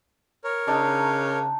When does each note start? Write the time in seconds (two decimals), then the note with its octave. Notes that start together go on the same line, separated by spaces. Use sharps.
0.44 A#4 C#5
0.67 C#3 D4 D#4